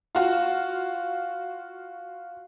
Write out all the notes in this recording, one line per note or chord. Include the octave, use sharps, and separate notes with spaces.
F4 F#4